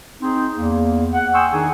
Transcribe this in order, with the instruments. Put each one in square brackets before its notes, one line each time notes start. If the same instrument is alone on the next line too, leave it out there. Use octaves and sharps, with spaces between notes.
[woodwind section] C4 D#4 G#4
E2 A#3
F#5
G5 G#5 C6 C#6 D#6 E6
D#3 D4 D#4 G#4 F#5 G#5